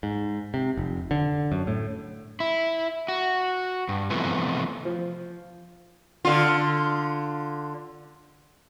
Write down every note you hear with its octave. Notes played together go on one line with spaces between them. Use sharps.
G#2
C3
F1
D3
F#2
A2
E4
F#4
G2
C3 E3 F3 A3 B3
F3
D3 F4